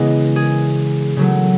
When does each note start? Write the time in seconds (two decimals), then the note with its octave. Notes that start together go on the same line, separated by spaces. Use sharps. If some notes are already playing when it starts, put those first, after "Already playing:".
Already playing: C#3 E3 G#3 B3 D#5
0.36 G#4
1.16 C#3 F#3 A3